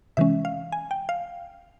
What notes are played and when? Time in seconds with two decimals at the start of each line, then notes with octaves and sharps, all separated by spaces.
0.17 C3 E3 G#3 C#4 E5
0.45 F5
0.72 G#5
0.91 G5
1.09 F5